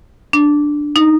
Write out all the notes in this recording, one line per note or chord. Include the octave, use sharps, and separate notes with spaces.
D4
D#4